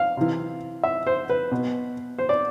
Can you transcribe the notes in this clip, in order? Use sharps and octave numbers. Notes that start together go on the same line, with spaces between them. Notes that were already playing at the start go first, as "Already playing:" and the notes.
Already playing: F5
C3 E3
E5
C5
B4
B2
C5
D5